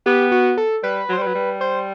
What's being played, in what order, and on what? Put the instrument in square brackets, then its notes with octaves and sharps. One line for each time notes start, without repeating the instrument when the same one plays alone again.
[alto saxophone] B3 [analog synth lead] G4
[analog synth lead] F#4
A4
[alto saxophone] G3 [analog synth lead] B4
[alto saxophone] F#3
[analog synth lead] C5
[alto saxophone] G3
[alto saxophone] F#3 [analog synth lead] B4
[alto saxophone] G3
[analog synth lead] C5